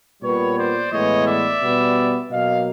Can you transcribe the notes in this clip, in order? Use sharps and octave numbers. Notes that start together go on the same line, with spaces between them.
A#2 G3 B3 B4 C#5
C5 D5
A2 E3 G#3 B3 C#5 D#5
D5 E5
B2 G3 B3
B2 F#3 A#3 D#5 F5